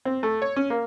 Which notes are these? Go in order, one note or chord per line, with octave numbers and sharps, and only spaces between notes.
C4
A3
C#5
C#4
A#3